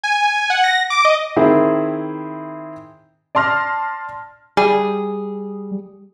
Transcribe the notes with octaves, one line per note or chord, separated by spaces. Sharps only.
G#5
F#5
A#6
D6
D#5
D#3 C4 E4 G#4
D5 A5 C6 F6 A#6
G3 G#4